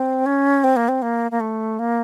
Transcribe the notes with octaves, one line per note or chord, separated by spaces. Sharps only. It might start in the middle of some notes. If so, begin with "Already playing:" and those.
Already playing: C4
C#4
C4
A#3
C4
A#3
A#3
A3
A#3